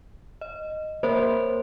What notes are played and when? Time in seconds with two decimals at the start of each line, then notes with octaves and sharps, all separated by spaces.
0.41 D#5
1.03 A#3 A#4 C5 C#5 E5